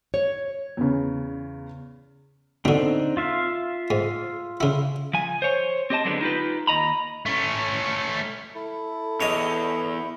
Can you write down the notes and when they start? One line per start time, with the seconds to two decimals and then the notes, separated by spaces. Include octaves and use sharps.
0.14 C#5
0.77 E2 C#3
2.65 B2 D3 C4 D4 D#4
3.17 F4 E5 F5
3.90 G#2
4.61 C#3 E4
5.13 F3 G#5
5.42 C5 C#5
5.90 C4 G4 D#5 A5
6.05 D3 F#3 G#3 B3 C#4 D4
6.21 D#4 F4 G4 B4
6.67 D#2 D#5 A#5 B5
7.26 A3 C#4
8.55 E4 A4
9.20 E2 C#5 D#5